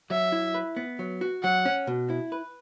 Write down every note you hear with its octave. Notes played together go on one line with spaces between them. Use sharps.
F#3 E5
E4
B4
B3
F#3
F#4
F#3 F#5
C#4
B2
E4
B4